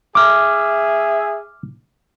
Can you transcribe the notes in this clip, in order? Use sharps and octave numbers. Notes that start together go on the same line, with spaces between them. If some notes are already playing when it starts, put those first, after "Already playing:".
G#4 E5 D6 F6